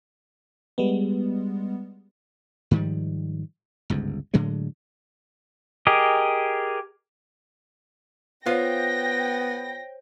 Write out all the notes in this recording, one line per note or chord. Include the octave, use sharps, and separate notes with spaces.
G3 G#3 B3
G#2 D#3 F3 G3
G1 C#2 G#2
A2 D3 F#3 G#3
G4 G#4 A#4 D#5
B3 F4 C5 C#5 F5 G5 A#6